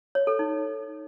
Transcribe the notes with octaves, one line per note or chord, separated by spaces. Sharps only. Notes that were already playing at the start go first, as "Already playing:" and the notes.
C#5
A4
D#4